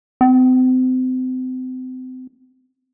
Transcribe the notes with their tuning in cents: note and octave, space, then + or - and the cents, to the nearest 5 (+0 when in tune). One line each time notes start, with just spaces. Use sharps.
C4 -35